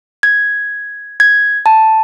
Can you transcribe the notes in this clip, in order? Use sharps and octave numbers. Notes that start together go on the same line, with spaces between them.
G#6
G#6
A5